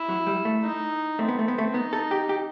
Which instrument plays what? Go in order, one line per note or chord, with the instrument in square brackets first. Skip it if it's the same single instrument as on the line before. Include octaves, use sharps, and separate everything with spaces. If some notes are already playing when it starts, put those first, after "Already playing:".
Already playing: [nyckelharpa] E4
[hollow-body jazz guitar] F#3
G3
A3
[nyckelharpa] D#4
[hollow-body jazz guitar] A3 [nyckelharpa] C4
[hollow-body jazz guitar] B3
A3
B3
A3
[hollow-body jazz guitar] B3 [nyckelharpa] D#4
[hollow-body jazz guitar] A4
G4
G4